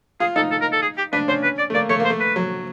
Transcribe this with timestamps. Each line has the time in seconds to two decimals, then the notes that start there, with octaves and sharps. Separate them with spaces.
0.20 F4 G#4
0.36 D#4 A4
0.51 A4
0.61 A#4
0.72 A4
0.82 G#4
0.97 G4
1.13 D4 B4
1.28 C#4 C5
1.43 B4
1.58 D5
1.70 A3
1.74 A#3 D5
1.89 A3 C#5
2.00 A#3 C5
2.10 A3
2.20 B4
2.36 F#3